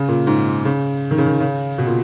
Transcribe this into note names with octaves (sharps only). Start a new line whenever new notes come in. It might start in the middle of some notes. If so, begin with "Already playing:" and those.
Already playing: C#3
A#2
G#2
C#3
D#3
C#3
D#3
C#3
B2
A#2